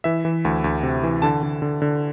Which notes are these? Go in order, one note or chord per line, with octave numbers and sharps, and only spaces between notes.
E3 E5
E3
D2
D2
C3
E3
D3 A5
D3
D3
D3